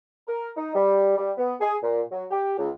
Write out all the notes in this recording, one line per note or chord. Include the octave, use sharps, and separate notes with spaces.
A#4
D#4
G3
G3
B3
G#4
A#2
F#3
G4
C#2